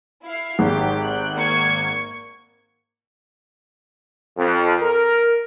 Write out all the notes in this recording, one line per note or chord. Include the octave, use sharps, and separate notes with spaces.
E4 F5 C7
G#1 G4
G5 F#6
A#3 C#6 G#6
F2
A#4